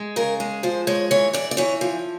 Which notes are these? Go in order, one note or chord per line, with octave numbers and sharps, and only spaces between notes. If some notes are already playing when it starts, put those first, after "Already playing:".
Already playing: G#3
C#3 A#4
G#3
F3 C5
G#3 C#5
E3 C#5
E3 D5
D5
E3 C#5
F3